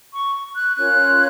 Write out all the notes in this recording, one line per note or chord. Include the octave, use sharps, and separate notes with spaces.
C#6
F#6
C#4 F4 A#4 C#5 F#6